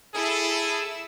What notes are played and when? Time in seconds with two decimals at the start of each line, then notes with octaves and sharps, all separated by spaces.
0.15 E4 G#4 A4 E6